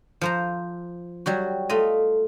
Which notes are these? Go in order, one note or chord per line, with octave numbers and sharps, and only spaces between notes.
F3 C5 A#5
F#3 G3 F#4
A3 F4 D#5